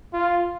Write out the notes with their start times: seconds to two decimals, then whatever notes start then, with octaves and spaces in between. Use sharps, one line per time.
0.13 F4